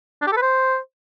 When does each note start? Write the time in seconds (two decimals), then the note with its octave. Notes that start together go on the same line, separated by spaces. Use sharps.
0.22 D4
0.27 G4
0.32 A4
0.37 B4
0.42 C5